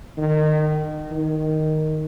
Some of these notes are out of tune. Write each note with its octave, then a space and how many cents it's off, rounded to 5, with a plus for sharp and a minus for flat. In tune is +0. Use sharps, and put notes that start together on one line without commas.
D#3 -25
D#3 +0